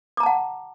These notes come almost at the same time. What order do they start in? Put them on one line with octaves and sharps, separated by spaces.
D6 A#5 A5 F#5